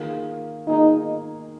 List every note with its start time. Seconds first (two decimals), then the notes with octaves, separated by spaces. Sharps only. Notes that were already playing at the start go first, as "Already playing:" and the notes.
Already playing: D#3 A#3 F4 G#4
0.66 D#3 A#3 D#4 F4 G#4